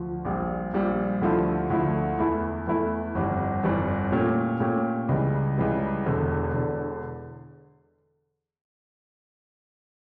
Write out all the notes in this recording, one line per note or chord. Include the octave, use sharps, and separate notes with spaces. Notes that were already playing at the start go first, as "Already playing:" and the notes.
Already playing: D2 F3
A#1 A#2 G3
A#1 A#2 G3
D2 D3 F3 A3 E4
D2 D3 F3 A3 E4
E2 E3 A3 E4 A4
E2 E3 A3 E4 A4
G1 F2 E3 G3
G1 F2 E3 G3
A#2 A3 C#4 G4
A#2 A3 C#4 G4
C#2 C#3 E3 G3
C#2 C#3 E3 G3
E1 E2 D3
E1 E2 D3